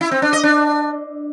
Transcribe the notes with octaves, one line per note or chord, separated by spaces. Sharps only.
E4
C4
D4
D#5
D4